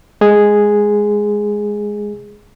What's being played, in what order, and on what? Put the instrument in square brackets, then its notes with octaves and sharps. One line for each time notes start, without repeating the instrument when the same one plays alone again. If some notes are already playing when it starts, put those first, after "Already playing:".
[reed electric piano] G#3 G#4